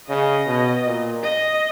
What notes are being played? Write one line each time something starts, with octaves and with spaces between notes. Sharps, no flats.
C#3 D#5
B2
A#2
D#5